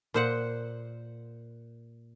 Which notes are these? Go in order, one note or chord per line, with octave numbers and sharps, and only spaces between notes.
A#2 C5 F#5